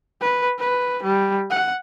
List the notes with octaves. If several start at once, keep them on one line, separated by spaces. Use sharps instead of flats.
B4
B4
G3
F#5